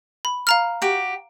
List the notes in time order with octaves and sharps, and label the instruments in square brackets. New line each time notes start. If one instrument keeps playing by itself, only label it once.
[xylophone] B5
F5 A#5 F6
[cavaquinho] F#4 G4